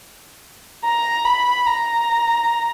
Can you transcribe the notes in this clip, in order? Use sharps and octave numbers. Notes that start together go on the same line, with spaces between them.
A#5
B5
A#5